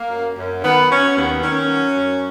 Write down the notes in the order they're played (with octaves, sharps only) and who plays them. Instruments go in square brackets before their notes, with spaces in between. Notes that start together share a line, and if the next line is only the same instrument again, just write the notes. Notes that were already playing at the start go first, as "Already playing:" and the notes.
Already playing: [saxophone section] A#3
F#2
F#2
D#3 B3
F#3 C#4
D#2 B3
D#3 C#4
F#3
F#2